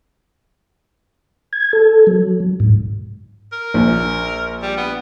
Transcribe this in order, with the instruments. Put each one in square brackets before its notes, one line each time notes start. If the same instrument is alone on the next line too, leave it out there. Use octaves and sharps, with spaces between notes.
[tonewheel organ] G#6
A4
F#3
G#2
[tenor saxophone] A#4
[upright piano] A#1
[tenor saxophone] G3
B3